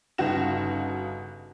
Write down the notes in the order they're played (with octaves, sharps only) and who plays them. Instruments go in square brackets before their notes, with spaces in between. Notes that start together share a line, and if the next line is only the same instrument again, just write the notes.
[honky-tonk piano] G1 C#3 D#4 F#4 A#6 E7